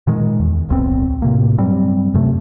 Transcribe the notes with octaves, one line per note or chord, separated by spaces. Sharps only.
A#2 D#3 G#3
E2
D1 B1 B3 C4
A2 C3 A#3
G2 F#3 G3 C4
F#2 C3 A3